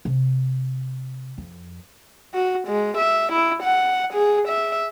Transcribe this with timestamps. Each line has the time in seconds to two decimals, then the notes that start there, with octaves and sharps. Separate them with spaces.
0.05 C3
1.38 F2
2.34 F#4
2.68 G#3
2.98 E5
3.33 E4
3.63 F#5
4.13 G#4
4.48 E5